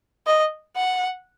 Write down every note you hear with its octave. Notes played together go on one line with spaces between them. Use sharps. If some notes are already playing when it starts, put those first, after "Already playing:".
D#5
F#5